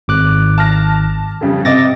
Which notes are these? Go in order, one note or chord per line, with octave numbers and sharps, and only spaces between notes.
G#1 D6 F#6
A5 F6 A#6
F2 C#3 G3
C3 D#5 D6 A6 A#6